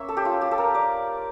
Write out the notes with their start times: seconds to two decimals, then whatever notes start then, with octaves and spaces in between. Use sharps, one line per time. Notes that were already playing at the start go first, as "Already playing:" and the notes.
Already playing: A#3 C#4 C#5 E5
0.08 A4
0.17 G4
0.25 F4
0.41 G4
0.51 A4
0.58 A#4
0.74 D5